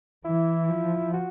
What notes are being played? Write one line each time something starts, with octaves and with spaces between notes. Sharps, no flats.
E3 E4
F3
F#4